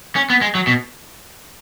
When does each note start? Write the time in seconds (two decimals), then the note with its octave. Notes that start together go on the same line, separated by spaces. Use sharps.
0.16 C#4
0.30 B3
0.41 G#3
0.55 F#3
0.67 B2